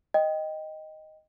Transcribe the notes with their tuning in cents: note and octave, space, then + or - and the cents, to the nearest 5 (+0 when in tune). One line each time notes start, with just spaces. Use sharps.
D#5 +0 G5 +0